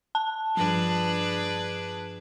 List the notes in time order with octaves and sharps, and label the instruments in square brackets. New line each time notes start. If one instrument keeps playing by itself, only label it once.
[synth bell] A5
[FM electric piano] G2 F3 [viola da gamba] D4 G#4 B4